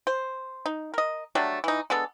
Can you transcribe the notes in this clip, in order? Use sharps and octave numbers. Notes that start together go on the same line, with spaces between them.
C5
D#4
A#4 D#5
F#3 G3 A3 D4
E3 D#4
G#3 B3 D4 A4